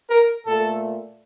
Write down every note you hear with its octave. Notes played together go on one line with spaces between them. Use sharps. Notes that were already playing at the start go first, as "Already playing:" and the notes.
A#4
A#2 A3 A4